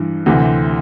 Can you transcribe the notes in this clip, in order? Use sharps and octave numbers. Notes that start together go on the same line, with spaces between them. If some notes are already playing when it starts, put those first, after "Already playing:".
Already playing: G2 E3
D2 C3 E3